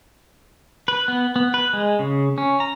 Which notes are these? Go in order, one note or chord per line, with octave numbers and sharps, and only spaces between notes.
B4
B3
B3
B4
G#3
C#3
C#4
A#5